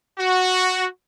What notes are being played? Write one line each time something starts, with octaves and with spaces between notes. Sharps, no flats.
F#4